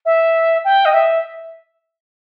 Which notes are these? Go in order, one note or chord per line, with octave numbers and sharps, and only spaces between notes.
E5
G5
D#5
E5